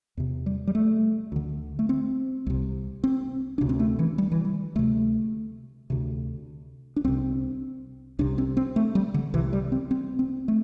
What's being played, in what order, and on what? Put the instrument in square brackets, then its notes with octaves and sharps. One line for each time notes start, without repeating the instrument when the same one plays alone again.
[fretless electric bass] E2 C3
G3
G3
A3
D2 D3
A3
C4
C2 C3
C4
D2 C3 D4
C4
A3
E3
G3
E3
G3
D2 C3 A3
D2 C3
D4
C2 C3 C4
C2 C3 D4
C4
C4
A3
G3
D3
C2 C3 E3
G3
C4
C4
C4
A3